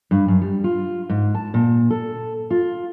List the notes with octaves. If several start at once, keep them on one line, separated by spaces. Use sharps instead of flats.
G2
F#2
G3
F4
G#2
A5
A#2
A4
F4